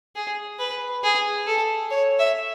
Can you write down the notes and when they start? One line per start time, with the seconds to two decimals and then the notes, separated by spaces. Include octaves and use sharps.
0.16 G#4
0.59 B4
1.03 G#4
1.46 A4
1.91 C#5
2.19 E5